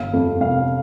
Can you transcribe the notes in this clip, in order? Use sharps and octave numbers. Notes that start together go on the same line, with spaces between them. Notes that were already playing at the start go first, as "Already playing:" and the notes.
Already playing: G1 F5
F2
C3 F5